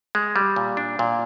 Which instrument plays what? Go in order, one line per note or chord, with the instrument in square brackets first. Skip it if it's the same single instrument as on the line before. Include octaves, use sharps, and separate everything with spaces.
[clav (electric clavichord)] G#3
G3
A#2
D4
A#2